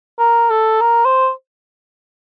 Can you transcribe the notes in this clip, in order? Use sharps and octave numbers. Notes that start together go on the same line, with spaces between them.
A#4
A4
A#4
C5